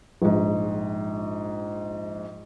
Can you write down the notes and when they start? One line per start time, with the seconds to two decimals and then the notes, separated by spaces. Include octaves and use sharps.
0.22 A#1 G#2